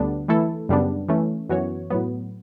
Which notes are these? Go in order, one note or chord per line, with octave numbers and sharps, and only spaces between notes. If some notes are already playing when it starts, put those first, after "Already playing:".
Already playing: D2 D3 G3 B3 D4
E3 A3 E4 A4
F#2 C#3 G3 B3 D4
E3 A3 C#4
F#2 E3 B3 F#4 C#5
A2 F#3 B3